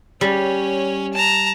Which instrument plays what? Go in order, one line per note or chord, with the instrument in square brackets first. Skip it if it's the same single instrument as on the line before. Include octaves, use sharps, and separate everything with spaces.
[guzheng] G3 [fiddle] C#4 C#5
[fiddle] A5 A#5